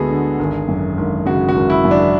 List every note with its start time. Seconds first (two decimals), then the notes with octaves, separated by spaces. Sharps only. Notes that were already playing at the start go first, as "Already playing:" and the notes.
Already playing: D2 D3 G#3 B3 F#4 G#4 A4
0.10 D3
0.39 G#1
0.68 F#2
0.97 G#1
1.26 C#3 F#4
1.49 F#4
1.55 G#1
1.70 E4
1.85 F#2
1.91 D4